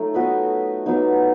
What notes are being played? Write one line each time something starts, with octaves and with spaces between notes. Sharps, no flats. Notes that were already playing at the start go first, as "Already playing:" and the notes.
Already playing: F#3 A3 D#4 A4
B3 F#4 B4 D#5
F#3 B3 D#4